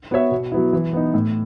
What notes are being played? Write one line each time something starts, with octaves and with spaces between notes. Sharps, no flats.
B3 F#4 C#5 E5
B2
F#3 B3 E4
E3
B3 D#4
A2